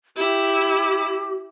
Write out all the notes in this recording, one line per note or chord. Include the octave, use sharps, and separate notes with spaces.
E4 G4